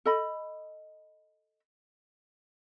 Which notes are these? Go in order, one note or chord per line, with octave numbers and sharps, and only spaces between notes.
A4 D#5 B5